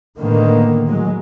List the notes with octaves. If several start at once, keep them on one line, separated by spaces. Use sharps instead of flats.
A2 D3 D#3 A#3 B3
A2 F#3 G#3